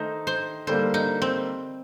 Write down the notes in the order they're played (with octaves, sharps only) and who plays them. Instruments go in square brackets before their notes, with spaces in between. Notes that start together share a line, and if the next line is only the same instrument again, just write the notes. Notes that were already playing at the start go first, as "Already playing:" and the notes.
Already playing: [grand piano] D#3 A3 D#4 [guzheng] C5
[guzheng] C5
[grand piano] D3 G3 A#3 [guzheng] C5
[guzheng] D#4
C4